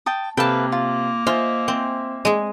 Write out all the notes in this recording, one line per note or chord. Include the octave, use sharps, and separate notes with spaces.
G5 A5 D#6
C3 A#3 A4 B4 F5 G5 A5
F4
F4 C5 D#5 E5 G#5
C4
G#3 G#4